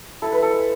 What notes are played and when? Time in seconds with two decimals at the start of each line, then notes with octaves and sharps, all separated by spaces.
0.22 E4 A4
0.32 B4
0.38 E4 A4
0.53 G#3